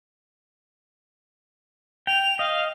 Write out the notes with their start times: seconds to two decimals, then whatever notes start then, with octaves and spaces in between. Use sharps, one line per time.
2.07 G5 F7
2.39 D#5 F5